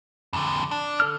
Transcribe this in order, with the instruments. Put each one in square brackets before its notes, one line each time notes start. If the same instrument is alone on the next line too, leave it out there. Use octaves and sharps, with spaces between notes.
[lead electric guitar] F2 D3
D4
[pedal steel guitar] D3 A4 F6